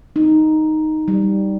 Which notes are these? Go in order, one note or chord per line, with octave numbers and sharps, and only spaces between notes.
D#4
G3